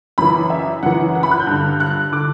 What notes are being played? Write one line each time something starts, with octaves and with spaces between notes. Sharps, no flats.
F#2 E3 B5
E5
F#2 E3 F#5
F#5
B5
F#6
G6
G2 D3
F#6
D3 D6